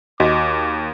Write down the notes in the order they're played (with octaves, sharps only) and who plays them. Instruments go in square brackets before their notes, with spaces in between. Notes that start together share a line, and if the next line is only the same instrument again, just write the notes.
[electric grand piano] D#2 [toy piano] F#4 D#5 [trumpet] D6